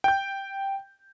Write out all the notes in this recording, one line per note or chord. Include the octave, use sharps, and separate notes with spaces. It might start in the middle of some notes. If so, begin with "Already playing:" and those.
G5 G6